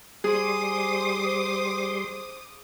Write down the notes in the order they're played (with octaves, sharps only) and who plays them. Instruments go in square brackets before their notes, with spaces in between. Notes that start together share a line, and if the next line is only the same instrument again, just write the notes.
[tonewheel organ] G3 C6 [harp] G#4 [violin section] C5 D6 D#6